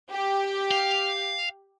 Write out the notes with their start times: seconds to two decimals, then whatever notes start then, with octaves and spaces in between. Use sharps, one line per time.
0.11 G4
0.71 F5